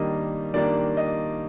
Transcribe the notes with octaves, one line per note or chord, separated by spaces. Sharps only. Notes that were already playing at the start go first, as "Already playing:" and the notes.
Already playing: D#3 G3 A#3 D4 D#5
D#3 G3 A#3 D4 D5
D#5